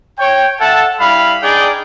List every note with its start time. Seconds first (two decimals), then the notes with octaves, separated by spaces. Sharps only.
0.19 C#5 G5
0.60 A4 E5 F#5 A5
1.00 G3 E4 F5 B5
1.43 D4 D#4 G#4 D5 G5